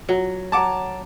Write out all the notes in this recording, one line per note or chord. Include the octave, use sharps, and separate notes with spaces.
F#3
C#5 F#5 A5 A#5 D6